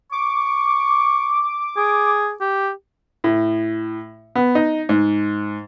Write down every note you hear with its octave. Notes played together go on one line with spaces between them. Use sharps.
C#6 D6
G#4
G4
A2
B3
D#4
G#2